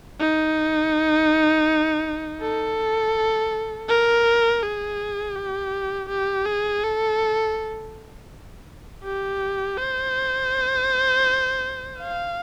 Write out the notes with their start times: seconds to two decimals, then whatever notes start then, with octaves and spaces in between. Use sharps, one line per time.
0.20 D#4
2.41 A4
3.89 A#4
4.63 G#4
5.35 G4
6.09 G4
6.46 G#4
6.83 A4
9.04 G4
9.78 C5
12.00 F5